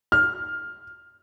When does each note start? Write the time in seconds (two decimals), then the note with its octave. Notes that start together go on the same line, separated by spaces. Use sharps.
0.12 F6